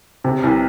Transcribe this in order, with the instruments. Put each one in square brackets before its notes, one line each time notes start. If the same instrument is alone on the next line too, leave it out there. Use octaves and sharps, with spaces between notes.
[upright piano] C3
C2